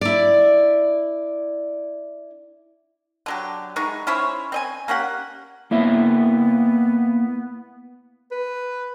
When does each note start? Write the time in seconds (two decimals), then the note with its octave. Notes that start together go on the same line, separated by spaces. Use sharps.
0.01 E4 D5
3.26 D3 F#3 G4
3.76 E3 G#3 D#4 C#6
4.07 C#4 E4 C5 C#5
4.52 C4 D#5 G#5
4.88 A#3 C#4 G4 F#5
5.71 A#3 B3 E4 E5
8.32 B4